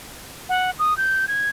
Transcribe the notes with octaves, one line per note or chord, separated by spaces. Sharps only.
F#5
D#6
G6
G#6